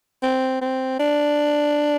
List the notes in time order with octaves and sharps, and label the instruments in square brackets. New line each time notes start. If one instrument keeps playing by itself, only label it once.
[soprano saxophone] C4
C4
D4